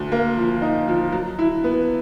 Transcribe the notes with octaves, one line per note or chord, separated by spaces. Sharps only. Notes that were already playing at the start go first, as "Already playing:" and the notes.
Already playing: D2
A#3
F3
D#4
F3
F#3
E4
B3